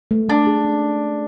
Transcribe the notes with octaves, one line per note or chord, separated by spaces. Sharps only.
A3
A3 D4
G#4
C#4